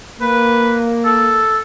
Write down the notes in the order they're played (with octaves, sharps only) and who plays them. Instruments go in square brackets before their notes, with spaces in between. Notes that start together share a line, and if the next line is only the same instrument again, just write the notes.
[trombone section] A#3 [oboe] B4
[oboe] A4